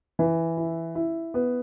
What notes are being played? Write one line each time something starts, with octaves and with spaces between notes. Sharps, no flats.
E3
E4
E4
B3